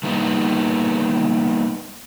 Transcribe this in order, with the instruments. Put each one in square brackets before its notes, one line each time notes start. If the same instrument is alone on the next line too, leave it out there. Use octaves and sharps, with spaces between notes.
[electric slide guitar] G3 A#3 B3 D#4 B4